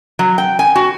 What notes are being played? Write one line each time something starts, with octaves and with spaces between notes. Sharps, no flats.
F#3
G5
G#5
F#4